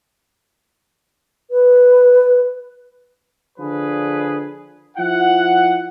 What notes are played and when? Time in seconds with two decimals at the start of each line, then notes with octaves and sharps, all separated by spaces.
1.51 B4
3.59 D3 F3 G#4 B4
4.97 F3 E4 F#5